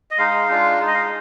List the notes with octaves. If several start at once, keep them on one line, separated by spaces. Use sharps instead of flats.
D#5
G#3 D#4 F5
G#3 D4 F4
G#3 D#4
D#5
F5